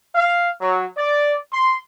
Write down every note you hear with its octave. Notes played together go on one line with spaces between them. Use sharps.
F5
F#3
D5
C6